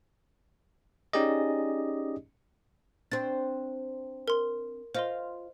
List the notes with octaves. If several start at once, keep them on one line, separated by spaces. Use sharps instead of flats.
C#4 D#4 G4 G#4 D5 D#5
C4 D4 A6
A#4 C6
F4 C5 D#5 C6